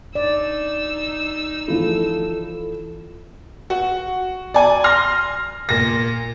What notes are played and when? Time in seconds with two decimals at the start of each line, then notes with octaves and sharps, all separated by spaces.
0.15 D#4 D5 E6
1.68 E3 F3 E4 A4
3.70 F#4
4.54 D5 G#5
4.84 C6 F6 A#6
5.69 A#2 A#6